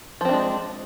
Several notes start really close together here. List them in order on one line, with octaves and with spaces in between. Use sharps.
F3 C4 D4 G#3